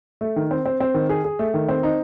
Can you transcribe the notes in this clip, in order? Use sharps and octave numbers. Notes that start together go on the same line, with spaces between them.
A3
D#3
C4
C4
C4
D#3
G#4
G#4
A3
D#3
C4
D#4